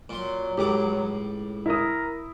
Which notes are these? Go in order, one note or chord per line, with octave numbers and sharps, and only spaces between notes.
A#2 F#3 C6
C#2 A2 G4 D6
E4 A#4 D#6